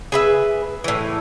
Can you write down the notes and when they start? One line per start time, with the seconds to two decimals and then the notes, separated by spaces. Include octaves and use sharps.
0.12 G#4 B4 E5
0.84 A2 E3